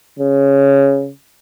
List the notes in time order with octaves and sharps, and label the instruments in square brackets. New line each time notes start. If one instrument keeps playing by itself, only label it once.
[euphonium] C#3